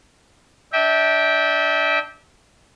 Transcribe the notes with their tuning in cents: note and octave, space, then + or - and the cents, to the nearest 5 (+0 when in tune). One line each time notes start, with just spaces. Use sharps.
D4 +0 E5 -30 G5 +0